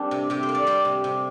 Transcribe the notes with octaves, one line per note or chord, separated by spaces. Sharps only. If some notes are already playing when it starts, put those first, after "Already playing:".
Already playing: G3 A#3 C4 D4
C3
C3 G4
C5
A#3
D5
G3 C5
C3
C3